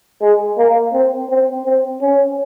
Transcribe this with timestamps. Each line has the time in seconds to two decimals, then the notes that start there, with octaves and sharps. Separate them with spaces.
0.21 G#3
0.58 A#3
0.94 C4
1.30 C4
1.66 C4
2.01 C#4